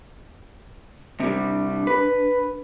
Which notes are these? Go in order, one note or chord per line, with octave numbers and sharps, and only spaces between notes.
C3 G3 D4
B4